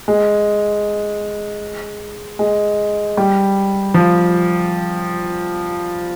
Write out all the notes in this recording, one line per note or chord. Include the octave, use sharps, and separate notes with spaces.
G#3
G#3
G3
F3